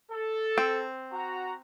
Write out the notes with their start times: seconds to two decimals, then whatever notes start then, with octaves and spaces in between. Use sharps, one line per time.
0.12 A4
0.58 C4
1.13 F#4 A#5